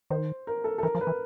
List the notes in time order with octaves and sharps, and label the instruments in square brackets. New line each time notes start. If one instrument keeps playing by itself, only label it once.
[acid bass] D#3 [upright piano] C5
[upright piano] A#4
A4
A4
[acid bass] E3 [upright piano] A#4
[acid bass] F3
[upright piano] B4
[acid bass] E3